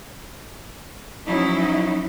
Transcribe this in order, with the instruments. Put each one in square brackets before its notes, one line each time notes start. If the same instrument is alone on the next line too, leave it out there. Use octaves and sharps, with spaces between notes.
[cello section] F3 F#3 C#4 D#4 E4